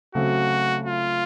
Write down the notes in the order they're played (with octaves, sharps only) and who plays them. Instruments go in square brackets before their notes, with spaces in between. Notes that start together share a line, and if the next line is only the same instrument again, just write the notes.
[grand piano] C#3 F#3 A3 C4 [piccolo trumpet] F#4
[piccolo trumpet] F4